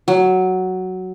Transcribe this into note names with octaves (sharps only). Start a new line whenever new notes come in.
F#3